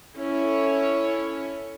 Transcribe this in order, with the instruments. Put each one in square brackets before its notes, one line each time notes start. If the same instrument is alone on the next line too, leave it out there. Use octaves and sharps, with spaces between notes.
[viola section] C#4 E4 A4 C#5